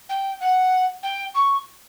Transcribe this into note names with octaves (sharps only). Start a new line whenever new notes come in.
G5
F#5
G5
C#6